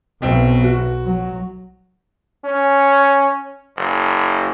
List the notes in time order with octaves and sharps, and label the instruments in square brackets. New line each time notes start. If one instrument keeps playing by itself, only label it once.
[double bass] B1 [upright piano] B2 C4
[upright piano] F#4
[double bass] F#3
[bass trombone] C#4
F#1